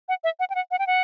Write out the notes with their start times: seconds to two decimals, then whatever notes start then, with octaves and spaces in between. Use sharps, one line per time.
0.09 F#5
0.24 E5
0.40 F#5
0.50 G5
0.55 F#5
0.71 F#5
0.79 G5
0.87 F#5